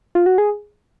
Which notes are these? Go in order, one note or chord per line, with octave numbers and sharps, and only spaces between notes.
F4
F#4
G#4